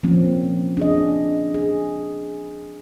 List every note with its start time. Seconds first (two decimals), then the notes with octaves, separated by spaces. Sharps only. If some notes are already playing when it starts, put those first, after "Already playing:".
0.03 F3 A#3 C4 C#4
0.77 D4 G#4 D#5
1.54 G#4